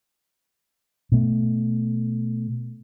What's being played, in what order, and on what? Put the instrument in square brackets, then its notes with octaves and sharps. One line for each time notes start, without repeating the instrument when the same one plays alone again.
[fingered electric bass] B2 A3